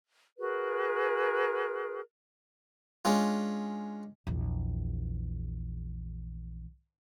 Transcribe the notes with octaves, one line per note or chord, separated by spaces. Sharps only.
F#4 G#4 A#4 B4
G#3 C#4 D4 F4
A#1 E2